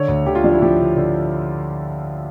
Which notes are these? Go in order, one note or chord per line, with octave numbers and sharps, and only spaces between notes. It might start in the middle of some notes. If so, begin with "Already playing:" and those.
Already playing: D3 C#5
D2
D3 G4
F4
F3 D4
E4
F3 G4
D3
D3